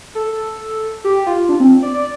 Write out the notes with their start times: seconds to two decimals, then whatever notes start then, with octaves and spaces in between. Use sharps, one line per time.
0.15 A4
1.04 G4
1.27 F4
1.49 D4
1.60 C4
1.83 D5
1.94 D5